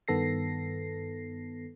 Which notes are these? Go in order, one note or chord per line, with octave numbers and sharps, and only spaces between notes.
G2 D#3 B3 A4 A#6 C7